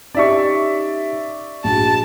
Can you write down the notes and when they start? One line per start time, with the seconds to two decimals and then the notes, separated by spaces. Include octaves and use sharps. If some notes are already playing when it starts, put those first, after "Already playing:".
0.15 C#4 D#4 G4 D5 E5 C#6
1.64 A#1 F#4 A5